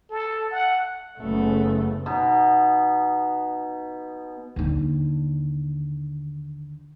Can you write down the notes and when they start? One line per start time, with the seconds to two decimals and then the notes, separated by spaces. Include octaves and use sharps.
0.10 A4
0.52 F#5
1.18 F#1 C#3 A3 B3
2.06 B2 D#4
4.56 D#2 D3